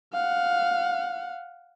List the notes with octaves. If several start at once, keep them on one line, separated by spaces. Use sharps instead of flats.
F5 F#5